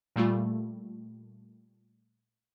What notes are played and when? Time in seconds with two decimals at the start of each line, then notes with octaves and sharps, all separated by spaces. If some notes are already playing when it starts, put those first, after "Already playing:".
0.16 A#2 G3 A3 F4